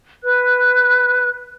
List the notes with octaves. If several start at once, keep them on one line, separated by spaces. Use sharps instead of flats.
B4 F#6